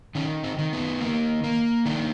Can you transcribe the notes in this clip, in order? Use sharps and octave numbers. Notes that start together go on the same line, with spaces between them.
D#3 C#4
C4
D#3
B3
A#3
A#3
D#3 D4